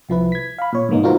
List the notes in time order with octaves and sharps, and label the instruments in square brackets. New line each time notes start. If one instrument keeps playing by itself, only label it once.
[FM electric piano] C2 F3 E4 B4
G#6 B6
F5 B5
A#2 C#5
G#2 C3 E3 A#3 B3 D#4
D#4 F4 F#4 A#4 C5